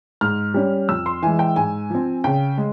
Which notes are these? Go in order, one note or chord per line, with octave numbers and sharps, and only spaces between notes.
G#2 F6
G3 C#4
F2 E6
C6
E3 G#3 G#5
G5
G#2 G#5
F3 C4
C#3 G5
G#3